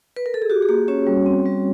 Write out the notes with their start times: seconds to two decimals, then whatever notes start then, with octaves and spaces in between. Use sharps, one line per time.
0.16 B4
0.26 A#4
0.34 A4
0.42 G#4
0.50 F#4 G4
0.62 G#4
0.69 A#3 G4
0.88 C#4 F#4 C#5
1.07 G3
1.26 C4
1.46 G3